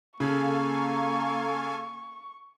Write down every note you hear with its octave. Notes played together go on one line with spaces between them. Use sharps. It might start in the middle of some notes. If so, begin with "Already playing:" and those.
C#3 A#3 A4 F5 G#5 C#6